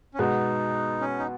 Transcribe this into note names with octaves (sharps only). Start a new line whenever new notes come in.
C#4
B2 G#3 B3 D#4 F#4
C#4
D#4